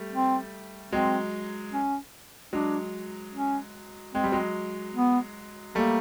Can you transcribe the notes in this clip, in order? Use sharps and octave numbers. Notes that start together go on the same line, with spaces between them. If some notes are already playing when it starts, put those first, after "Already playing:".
Already playing: G3 A3
C4
F#3 G#3 C4
C#4
F#3 G#3 D4
C#4
G#3 C4
G3
F#3 G#3
B3
G3 A3 A#3